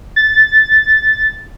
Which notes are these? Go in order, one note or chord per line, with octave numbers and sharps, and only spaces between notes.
A6